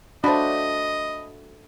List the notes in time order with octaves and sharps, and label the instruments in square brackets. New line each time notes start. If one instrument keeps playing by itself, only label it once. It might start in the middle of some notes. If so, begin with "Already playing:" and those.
[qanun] A3 F#4 [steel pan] D4 C5 [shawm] D#5 [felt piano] A5 B5